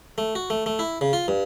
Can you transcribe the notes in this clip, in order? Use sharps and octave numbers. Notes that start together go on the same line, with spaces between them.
A3
F#4
A3
A3
E4
C#3
F4
G2